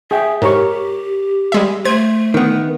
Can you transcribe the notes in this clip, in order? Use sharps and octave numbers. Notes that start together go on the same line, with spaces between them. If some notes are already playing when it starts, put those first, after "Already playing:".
G#4 E5 G5
G#2 G4 A#4 C#5 C#6
G3 G#3 E5
A3 C5 G#6
D#3 B3